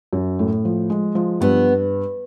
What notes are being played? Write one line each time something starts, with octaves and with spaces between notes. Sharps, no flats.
F#2
A2
F3
G#3
F3
G2 B3